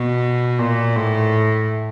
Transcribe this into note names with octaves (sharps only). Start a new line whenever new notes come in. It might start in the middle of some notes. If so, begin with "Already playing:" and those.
Already playing: B2
A#2
A2